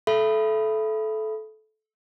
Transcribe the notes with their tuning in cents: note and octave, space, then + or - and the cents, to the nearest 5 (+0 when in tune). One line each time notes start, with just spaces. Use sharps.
A4 -20 E5 +30 B5 +0